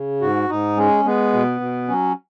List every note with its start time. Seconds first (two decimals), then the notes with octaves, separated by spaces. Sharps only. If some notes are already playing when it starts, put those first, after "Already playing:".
Already playing: C#3
0.21 G#2 F#4
0.49 G#2 D#4
0.77 G#3 C#4
1.05 G#3 B3
1.33 B2
1.60 B2
1.88 F#3 C#4